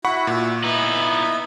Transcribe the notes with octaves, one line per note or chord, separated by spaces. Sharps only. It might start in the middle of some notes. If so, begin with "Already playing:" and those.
E4 F#4 F#5 B5 C#6
A#2
B3 D#4 E4 B4 B5